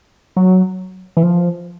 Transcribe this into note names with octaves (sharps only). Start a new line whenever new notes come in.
F#3
E3
F3